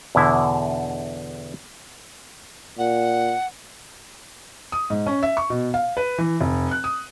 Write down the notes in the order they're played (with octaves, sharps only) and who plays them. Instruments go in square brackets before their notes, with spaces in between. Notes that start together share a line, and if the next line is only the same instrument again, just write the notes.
[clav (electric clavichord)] E2 B2 D3 E4
[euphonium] A#2 [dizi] F#5
[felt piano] D#6
G#2
C#4
E5
C#6
B2
F5
B4
E3
F1
F#6
D#6